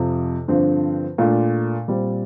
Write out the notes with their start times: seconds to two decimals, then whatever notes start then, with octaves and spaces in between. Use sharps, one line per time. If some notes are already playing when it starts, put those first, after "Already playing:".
Already playing: F2 C3 F3
0.48 G2 D3 F3 C4
1.18 A#2 A3 D4 F4
1.88 A#2 G3 C4